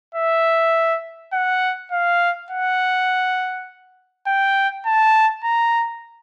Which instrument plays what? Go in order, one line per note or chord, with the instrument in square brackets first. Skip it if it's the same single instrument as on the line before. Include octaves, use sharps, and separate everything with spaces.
[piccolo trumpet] E5
F#5
F5
F#5
G5
A5
A#5